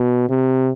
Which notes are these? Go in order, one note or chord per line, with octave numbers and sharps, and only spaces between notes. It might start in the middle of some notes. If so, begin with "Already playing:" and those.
Already playing: B2
C3